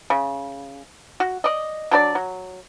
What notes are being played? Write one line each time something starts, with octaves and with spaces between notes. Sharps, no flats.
C#3
F#4
D5 D#5
F#3 D4 B4 D5
F#3